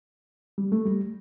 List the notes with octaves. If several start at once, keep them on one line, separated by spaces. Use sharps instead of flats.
G3
A3
G3